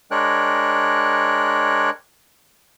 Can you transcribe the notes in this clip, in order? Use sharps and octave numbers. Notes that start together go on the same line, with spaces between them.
G#3 D4 A#4 C#5 G5 F#6